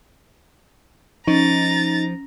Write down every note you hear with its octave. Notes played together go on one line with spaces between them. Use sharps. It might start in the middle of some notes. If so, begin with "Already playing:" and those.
F3 C#4 D#4 A#5 A6